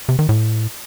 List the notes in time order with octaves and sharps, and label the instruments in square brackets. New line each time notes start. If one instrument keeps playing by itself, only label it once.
[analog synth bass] C3
D#3
A2